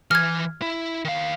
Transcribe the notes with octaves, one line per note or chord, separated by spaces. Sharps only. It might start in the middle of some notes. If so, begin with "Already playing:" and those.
E3 F6 G#6
E4
D#3 F5